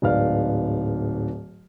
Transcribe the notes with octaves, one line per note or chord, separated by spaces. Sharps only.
D1 G#2 B4 D5 F5 F6